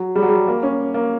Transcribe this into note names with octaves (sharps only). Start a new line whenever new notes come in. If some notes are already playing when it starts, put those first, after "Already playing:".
Already playing: F#3
G3
F#3
G3
A#3
C#4
A#3